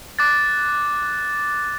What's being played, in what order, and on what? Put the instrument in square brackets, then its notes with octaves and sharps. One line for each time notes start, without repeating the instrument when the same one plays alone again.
[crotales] D6 F#6 A6